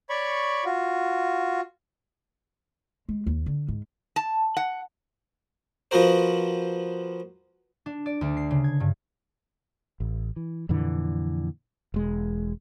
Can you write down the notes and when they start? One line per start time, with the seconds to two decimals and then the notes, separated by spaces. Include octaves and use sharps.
0.10 C#5 D5 B5 C#6
0.65 F4 F#4
3.09 G#3
3.27 D#2 A#3
3.46 D3
3.68 G#2
4.16 A5
4.57 F#5
5.91 F3 B3 F4 F#4 A#4 C5
7.86 D4
8.06 D5
8.21 D2
8.37 C7
8.51 C#3
8.64 G#6
8.80 G2
10.00 A1
10.36 E3
10.69 F2 A#2 D3 E3
11.94 E1 G#3